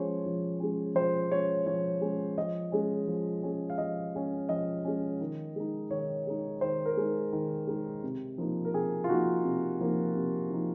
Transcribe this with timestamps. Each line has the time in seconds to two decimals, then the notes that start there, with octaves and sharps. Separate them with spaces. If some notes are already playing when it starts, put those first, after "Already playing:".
Already playing: F3 G#3 C#4 C5 C#5
0.25 F3
0.60 G#3 C#4
0.95 F3 C5
1.30 G#3 C#4 C#5
1.66 F3 C#5
2.01 G#3 C#4
2.38 F3 D#5
2.72 G#3 C#4
3.08 F3
3.43 G#3 C#4
3.70 F5
3.78 F3 D#5
4.15 G#3 C#4
4.49 F3 D#5
4.85 G#3 C#4
5.21 D#3
5.56 G#3 D#4
5.90 D#3 C#5
6.27 G#3 D#4
6.61 D#3 C5
6.86 A#4
6.97 G#3 D#4
7.33 D#3
7.67 G#3 D#4
8.03 C3
8.38 F3 A#3 D#4
8.65 A#4
8.73 C3 G#4
9.04 F4
9.09 F3 A#3 D#4 F#4
9.44 C3
9.81 F3 A#3 D#4
10.16 C3
10.50 F3 A#3 D#4